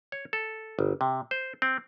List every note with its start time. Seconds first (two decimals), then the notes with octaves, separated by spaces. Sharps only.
0.12 C#5
0.33 A4
0.79 G1
1.01 C3
1.31 C5
1.62 C4